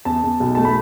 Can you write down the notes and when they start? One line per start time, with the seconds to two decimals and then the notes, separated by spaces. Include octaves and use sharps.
0.05 E2 A5
0.23 E2
0.40 B1
0.55 A3 A5
0.65 B5